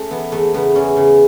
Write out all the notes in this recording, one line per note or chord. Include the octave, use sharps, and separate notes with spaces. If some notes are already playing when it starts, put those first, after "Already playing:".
Already playing: A3 C#4
E3 B3
E2 A3
C#3 B3
E2 C#4
C#3